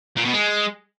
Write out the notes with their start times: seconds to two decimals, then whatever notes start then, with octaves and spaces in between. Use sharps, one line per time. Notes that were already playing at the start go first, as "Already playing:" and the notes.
0.17 A#2
0.25 B2
0.33 G#3